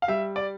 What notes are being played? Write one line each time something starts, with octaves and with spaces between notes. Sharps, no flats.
F5
G3 E5
D5